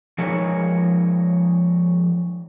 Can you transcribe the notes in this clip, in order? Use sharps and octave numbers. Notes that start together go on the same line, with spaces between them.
F3 G#3 D#4 G#4 A#4 C#5